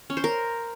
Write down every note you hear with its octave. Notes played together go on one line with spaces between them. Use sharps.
C#4
C5
A#4